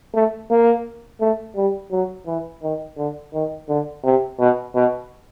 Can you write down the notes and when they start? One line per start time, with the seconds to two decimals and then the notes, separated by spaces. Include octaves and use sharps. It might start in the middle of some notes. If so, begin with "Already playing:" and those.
0.14 A3
0.50 A#3
1.21 A3
1.56 G3
1.92 F#3
2.27 E3
2.63 D#3
2.98 D3
3.33 D#3
3.69 D3
4.04 C3
4.39 B2
4.75 B2